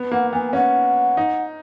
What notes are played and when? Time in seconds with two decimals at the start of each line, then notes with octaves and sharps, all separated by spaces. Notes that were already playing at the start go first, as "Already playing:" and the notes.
Already playing: B3
0.12 A#3 F#5
0.33 B3 G#5
0.53 C#4 F#5
1.17 D#4